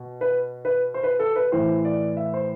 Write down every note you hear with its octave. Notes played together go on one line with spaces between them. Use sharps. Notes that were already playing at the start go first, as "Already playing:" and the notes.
Already playing: B2
B4
B4
C5
B4
A4
B4
A2 E3 C5
D5
E5
C5